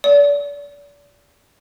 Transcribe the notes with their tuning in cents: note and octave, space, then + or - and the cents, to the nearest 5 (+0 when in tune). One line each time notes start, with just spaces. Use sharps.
D5 -35